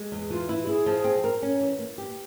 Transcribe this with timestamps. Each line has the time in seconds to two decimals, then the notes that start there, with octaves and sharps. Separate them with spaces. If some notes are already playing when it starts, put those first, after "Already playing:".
Already playing: G#3
0.12 E2
0.30 E3 F4
0.49 E4
0.64 G4
0.67 E4 G#4
0.86 F3
1.04 C4
1.24 A#4
1.42 C#4
1.61 E3
1.79 A#3
1.98 G4